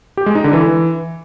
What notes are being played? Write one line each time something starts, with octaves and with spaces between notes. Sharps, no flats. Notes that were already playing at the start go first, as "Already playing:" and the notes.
G4
G#3
D#4
D3
E3